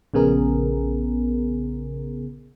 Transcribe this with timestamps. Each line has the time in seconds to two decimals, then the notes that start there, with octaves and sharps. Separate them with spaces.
0.14 A#1 C#3 B3 G#4 A#4